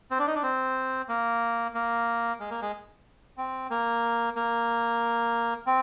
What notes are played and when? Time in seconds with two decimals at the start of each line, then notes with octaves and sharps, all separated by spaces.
0.11 C4
0.19 D4
0.27 D#4
0.35 D4
0.43 C4
1.09 A#3
1.75 A#3
2.40 G#3
2.51 A#3
2.62 G#3
3.38 C4
3.71 A#3
4.36 A#3
5.67 C4